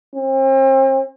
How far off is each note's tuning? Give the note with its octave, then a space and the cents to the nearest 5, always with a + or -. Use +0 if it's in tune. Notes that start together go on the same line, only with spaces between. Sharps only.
C4 +40